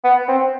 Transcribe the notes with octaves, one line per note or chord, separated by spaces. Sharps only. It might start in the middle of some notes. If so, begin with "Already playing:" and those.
B3
C4